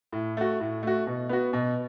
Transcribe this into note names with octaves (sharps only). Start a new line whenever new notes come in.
A2
A3 F#4
A2
A3 F#4
B2
B3 F#4
B2